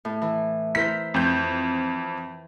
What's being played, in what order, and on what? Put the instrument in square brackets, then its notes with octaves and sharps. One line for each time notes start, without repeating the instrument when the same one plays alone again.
[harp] A2
E3
[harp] E4 A#4 C5 [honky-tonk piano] B6
[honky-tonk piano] F2 G6